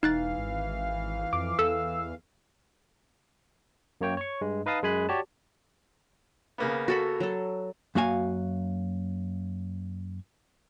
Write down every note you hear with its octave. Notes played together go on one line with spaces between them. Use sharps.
E1 E3 D#4 F5 F#6 A6
G#1
F2 D6
E2 A4 E6
F#2 A#3 C#5 G5
C#5 C#6
G2 G#3
D#4 B4 D#5 F5 A5 D#6
F#2 G#3 G#4 G#5 B5 F#6
F#4 G4 C#5 D5 A5
C#3 A#3 B3
F#4 A4 B5
F#3 A4
F#2 A#3 F#4 F5 G#5